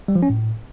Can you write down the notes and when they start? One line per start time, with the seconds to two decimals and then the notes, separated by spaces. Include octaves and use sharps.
0.08 G3
0.15 F3
0.23 C#4
0.30 A2